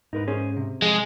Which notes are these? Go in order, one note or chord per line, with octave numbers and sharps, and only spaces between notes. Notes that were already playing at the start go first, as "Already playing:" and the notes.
G#2 D#4 A#4 B4
C#4 G#4 C5
C3
F3 G#3